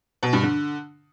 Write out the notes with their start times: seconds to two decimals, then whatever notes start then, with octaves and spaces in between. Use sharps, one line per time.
0.23 B2
0.33 G2
0.43 D3